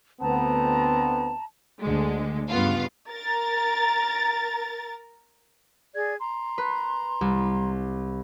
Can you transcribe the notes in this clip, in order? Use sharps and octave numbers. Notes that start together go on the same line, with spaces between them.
D2 B3 C4 A5 A#5
D2 D3 G#3
G2 C#3 B3 F4 F5
A#4 A#5 A6
G#4 D5 G#6
A#5 C6
B4
C2